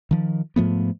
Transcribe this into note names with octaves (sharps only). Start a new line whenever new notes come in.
D#3 F3
G#2 F3 A3 B3